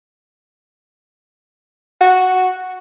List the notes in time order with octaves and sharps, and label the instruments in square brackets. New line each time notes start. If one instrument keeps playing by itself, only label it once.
[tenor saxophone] F#4